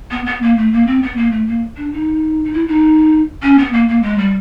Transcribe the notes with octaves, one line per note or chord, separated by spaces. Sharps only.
B3
B3
A#3
A3
A#3
C4
B3
A#3
A3
A#3
D4
D#4
D#4
E4
D#4
C#4
B3
A#3
A#3
G#3
G3